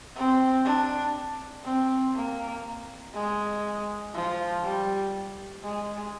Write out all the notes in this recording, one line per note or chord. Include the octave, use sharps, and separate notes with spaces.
C4
D4
C4
A#3
G#3
F3
G3
G#3